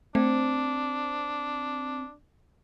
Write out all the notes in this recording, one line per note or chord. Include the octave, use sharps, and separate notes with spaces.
A3 C4 D4